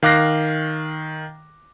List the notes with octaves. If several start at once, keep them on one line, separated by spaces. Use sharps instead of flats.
D#3 F5 D6 F#6 A#6 C7